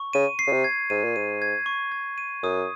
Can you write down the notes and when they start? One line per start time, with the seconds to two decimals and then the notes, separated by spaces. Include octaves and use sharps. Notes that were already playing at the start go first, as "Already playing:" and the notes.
Already playing: C#6
0.13 C#3 D#7
0.39 C7
0.47 C#3
0.52 C3
0.64 G#6
0.90 G#2 D#7
1.04 A#2
1.16 G#2 D#7
1.42 G#6
1.66 C#6
1.92 G#6
2.18 D#7
2.43 F#2 D#6